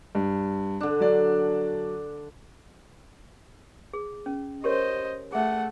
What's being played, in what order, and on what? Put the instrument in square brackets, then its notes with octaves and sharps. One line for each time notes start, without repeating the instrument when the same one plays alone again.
[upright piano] G2
[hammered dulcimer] D3 D4
[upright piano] F#3 D5
[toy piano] G#4
C#4
[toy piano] G4 A#4 C#5 [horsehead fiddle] C5 D#5
[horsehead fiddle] A3 F#5 [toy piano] G#4 E5